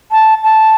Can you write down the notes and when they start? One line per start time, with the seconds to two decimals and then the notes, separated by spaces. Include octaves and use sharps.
0.12 A5
0.44 A5